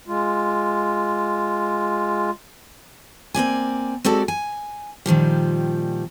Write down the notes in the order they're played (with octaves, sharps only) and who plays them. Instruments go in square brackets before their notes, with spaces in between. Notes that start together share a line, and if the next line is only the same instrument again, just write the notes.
[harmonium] G#3 F4
[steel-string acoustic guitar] A#3 C4 D5 G#5
G#3 C4 F#4 G4 A4 D5
G#5
A#2 D#3 F3 G3